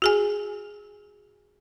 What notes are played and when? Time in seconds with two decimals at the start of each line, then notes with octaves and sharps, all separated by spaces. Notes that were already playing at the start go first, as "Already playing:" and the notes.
0.02 F#4 G#4 G#5